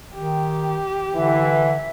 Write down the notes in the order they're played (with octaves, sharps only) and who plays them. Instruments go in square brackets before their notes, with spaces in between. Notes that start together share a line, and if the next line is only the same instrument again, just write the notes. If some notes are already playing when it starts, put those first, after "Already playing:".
[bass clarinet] D#3 [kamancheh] G4
[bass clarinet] D3 [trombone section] E3 [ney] E5